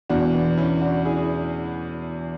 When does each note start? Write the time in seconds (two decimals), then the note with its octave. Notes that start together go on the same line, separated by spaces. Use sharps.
0.09 E2 B2 D4 F#4
0.34 B3 D4
0.57 C#4 E4
0.81 D4 F#4
1.05 E4 G#4